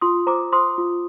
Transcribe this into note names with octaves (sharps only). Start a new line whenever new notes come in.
F4 C6 D#6
C5 A#5 D6
C5 C6 D#6
F4